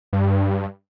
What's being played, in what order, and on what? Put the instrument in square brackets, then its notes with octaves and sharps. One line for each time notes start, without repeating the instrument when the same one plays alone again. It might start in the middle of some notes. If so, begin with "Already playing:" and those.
[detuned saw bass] G2